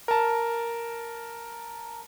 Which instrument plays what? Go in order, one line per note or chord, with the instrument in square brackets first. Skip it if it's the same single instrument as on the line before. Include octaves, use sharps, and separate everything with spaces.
[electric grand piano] A#4 A5